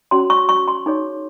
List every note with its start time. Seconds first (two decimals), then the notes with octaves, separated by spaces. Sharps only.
0.11 C#4 F#4 C#5 C6
0.30 C#6
0.49 C#6
0.68 C6
0.86 D#4 G#4 C#5